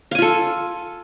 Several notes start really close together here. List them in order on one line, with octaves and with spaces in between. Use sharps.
F5 G#5 F4 A4